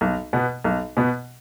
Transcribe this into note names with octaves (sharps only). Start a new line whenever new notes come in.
B1
B2 B3
B1
B2 B3